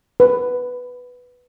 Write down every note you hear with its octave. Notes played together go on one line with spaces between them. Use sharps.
B4